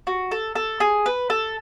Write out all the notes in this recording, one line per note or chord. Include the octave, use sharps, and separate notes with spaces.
F#4
A4
A4
G#4
B4
A4